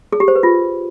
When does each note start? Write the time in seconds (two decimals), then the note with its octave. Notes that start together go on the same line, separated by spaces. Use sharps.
0.13 G#4
0.20 G4
0.28 C5
0.36 B4
0.43 F4